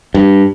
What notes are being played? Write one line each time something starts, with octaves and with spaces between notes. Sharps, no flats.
G2